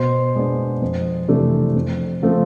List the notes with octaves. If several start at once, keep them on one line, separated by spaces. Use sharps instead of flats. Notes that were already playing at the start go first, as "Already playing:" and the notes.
Already playing: B2 C5
G#3 B3 D4
F2
C3 E3 A3 D4
F2
C#3 F3 A3 C4